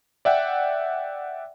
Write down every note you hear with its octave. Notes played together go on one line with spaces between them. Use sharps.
D5 E5 F#5 G5